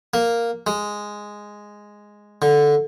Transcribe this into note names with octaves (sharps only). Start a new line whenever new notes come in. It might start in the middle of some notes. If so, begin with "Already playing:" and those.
A#3
G#3
D3